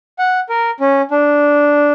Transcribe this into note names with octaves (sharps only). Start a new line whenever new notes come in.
F#5
A#4
C#4
D4